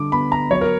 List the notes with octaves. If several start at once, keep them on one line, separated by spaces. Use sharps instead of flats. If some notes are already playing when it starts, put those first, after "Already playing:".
Already playing: D3 G3 D4 D6
B3 B5
A#5
F#3 C#5
A#4